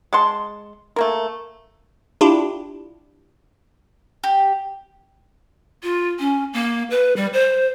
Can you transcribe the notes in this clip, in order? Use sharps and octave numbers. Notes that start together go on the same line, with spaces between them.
G#3 F#5 A5 C6
A3 A#3 A#4
D4 E4 F4 G4
G4
F4
C#4
A#3
B4
G3
C5